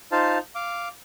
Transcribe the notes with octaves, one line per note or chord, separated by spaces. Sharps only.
D#4 F4 C5 F5 A5
F5 D6